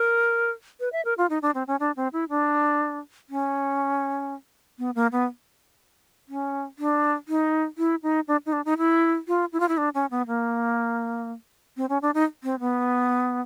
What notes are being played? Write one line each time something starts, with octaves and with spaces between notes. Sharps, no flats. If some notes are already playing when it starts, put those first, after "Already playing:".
Already playing: A#4
B4
E5
A#4
F4
D#4
D4
C4
C#4
D4
C4
E4
D4
C#4
B3
A#3
B3
C#4
D4
D#4
E4
D#4
D4
D#4
D4
D#4
E4
F4
E4
F4
E4
D4
C#4
B3
A#3
C4
C#4
D4
D#4
C4
B3